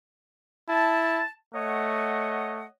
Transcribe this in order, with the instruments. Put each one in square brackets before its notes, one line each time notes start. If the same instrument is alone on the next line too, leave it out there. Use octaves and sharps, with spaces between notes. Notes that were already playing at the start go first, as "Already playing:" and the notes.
[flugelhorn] E4 [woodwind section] A5
[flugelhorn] A3 [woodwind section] C#5 D#5 F#5